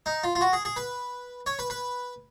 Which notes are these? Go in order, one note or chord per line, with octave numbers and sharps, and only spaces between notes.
D#4
F4
F4
F#4
G#4
G#4
B4
C#5
B4
B4